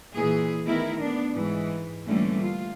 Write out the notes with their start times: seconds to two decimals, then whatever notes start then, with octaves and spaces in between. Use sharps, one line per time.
0.14 A#2 E3 G#4
0.65 D#3 A3 B3 E4 A#4
1.01 B3 D4
1.33 G#2 E3
2.06 D3 E3 G3 A3 A#3 C#4
2.41 F4